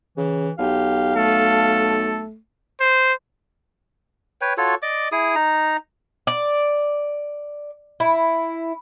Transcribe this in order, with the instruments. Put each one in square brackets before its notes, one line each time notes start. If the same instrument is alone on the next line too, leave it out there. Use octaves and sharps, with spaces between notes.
[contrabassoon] C#3 [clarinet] E3
[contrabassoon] B1 [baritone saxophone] G4 [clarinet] F5
[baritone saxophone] A3 [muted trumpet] A4
[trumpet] C5
[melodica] B4 C#5 G5
F4 F#4 A4 C#5
D5 D#5 D6
E4 G#4 D#6
D#4 A#5
[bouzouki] D5
E4